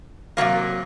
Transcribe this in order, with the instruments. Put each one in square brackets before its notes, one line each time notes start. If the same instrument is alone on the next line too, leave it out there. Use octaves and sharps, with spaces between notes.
[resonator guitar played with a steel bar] C3 D#3 F#3 A#3